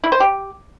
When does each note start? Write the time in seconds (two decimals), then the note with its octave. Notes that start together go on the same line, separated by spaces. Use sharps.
0.04 E4
0.12 C5
0.20 G4